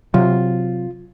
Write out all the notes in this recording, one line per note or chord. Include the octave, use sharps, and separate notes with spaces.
C3 F#3 F4